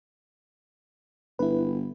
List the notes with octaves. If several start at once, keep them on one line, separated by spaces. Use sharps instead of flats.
G1 E4 B4